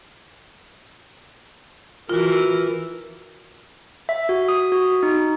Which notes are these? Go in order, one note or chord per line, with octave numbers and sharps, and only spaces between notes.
E3 F4 F#4 A#4
E5
F#4
D#6
F#4
D#4